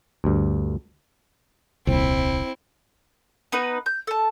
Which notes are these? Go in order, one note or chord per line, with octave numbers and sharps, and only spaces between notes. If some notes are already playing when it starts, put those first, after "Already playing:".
D2 G2
D#1 C2 C4 E4
B3 D#4 B4
G6
A4 A5